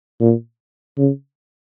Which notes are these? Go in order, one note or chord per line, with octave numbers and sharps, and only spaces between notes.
A#2
C#3